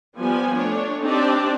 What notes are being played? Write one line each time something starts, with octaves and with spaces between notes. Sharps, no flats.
F3 G3 B3 G#5
A3 D4 C#5
C4 D4 D#4 G4 D5 A5